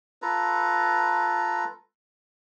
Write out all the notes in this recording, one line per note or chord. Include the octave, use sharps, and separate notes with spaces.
F4 A4 B4 A#5